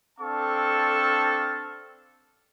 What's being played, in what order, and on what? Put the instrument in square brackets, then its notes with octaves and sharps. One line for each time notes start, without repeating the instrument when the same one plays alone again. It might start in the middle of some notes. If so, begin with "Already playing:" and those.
[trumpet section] C4 D4 A4 F5 A5 C#6